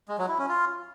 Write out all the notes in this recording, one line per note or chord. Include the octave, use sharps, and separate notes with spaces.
G#3
F#3
E4
C#4
F4